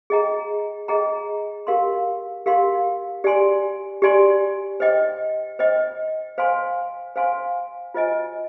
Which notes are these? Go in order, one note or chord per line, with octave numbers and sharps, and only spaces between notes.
G#4 D#5 G5 A#5
G#4 D#5 G5 A#5
G4 A#4 F5 C6
G4 A#4 F5 C6
G4 D5 G#5 C6
G4 D5 G#5 C6
C5 D#5 G5
C5 D#5 G5
C5 F5 G#5 C6
C5 F5 G#5 C6
F4 C5 D#5 G#5